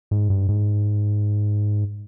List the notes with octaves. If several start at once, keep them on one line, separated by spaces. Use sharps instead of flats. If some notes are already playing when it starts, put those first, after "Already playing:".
G#2
G2
G#2